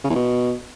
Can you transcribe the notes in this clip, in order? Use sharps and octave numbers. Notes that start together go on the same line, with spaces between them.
C#3
E2
B2